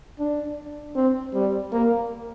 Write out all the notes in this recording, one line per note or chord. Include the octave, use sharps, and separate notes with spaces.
D4
C4
G3
A#3